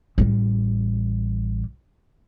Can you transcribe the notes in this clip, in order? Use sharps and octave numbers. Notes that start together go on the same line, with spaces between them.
A1 G3